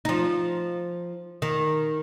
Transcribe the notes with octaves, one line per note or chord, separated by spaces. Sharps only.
F3 D#4
D#3